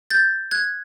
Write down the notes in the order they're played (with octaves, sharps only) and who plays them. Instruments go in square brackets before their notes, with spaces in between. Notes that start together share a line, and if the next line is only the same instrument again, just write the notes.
[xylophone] G6 A6
F#6 G#6